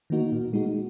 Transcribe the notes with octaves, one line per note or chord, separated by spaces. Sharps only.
D#3 A#3 D#4 F#4
A#2
G#3 D#4 F#4